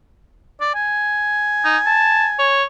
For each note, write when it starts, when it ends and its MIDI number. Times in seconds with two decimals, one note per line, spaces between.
0.61 0.72 74
0.75 2.58 80
1.65 1.78 63
1.86 2.28 81
2.39 2.64 73